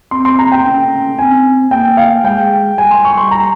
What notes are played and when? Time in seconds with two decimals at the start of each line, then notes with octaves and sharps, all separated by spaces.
0.11 C4 C6
0.25 C6
0.39 A#5
0.52 G5
0.65 C#4
1.19 C4 G#5
1.71 A#3 G5
1.97 F5
2.24 G#3 G5
2.78 G3 G#5
2.91 C6
3.05 C#6
3.17 C6
3.31 A#5